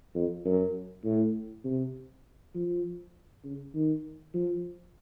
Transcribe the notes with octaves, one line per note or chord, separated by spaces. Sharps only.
F2
F#2
A2
C3
F3
C#3
D#3
F3